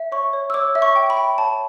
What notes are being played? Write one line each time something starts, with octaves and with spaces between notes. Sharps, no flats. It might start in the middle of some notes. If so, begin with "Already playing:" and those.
Already playing: E5
C#5 C#6
C#5
E6
C#5 D6
E5
C#6
G5
B5
G5
C#5 A5